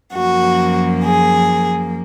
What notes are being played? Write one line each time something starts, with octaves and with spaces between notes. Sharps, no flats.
F#2 F3 A#3 F#4
G#4